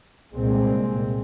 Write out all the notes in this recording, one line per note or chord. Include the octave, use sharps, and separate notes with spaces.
C2 A#2 G#3 C4